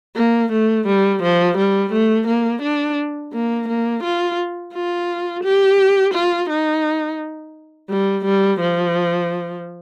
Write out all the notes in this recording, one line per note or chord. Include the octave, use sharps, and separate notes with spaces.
A#3
A3
G3
F3
G3
A3
A#3
D4
A#3
A#3
F4
F4
G4
F4
D#4
G3
G3
F3